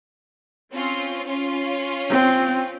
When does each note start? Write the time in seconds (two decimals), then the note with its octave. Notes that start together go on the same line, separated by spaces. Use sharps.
0.72 C4 C#4 F4
1.27 C#4 F4
2.10 C4